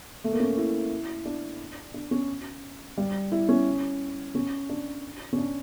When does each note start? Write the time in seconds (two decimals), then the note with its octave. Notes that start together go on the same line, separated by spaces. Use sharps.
0.24 A3
0.33 A#3
0.40 C#4
0.57 E4
1.25 D4
1.94 D4
2.11 C#4
2.97 G3
3.32 E4
3.49 C#4
4.35 C#4
4.69 D4
5.33 C#4
5.38 D4